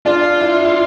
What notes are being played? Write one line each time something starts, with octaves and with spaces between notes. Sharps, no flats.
D4 F4
E4
E4